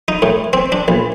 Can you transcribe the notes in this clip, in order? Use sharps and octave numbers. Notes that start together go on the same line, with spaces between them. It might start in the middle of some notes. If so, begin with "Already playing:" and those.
D#4
A2
C4
D4
A#1